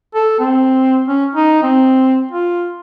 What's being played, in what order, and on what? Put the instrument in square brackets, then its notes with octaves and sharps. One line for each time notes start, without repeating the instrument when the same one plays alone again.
[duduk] A4
C4
C#4
D#4
C4
F4